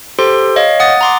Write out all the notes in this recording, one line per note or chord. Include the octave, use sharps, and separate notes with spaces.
G4 A4 C5 C6
C#5 D#5 F5
F#5 D#6 A6
A#5 C6 D6